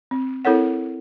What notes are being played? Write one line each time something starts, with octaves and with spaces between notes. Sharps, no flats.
C4
C4 E4 A4 A#4 C#5 F#5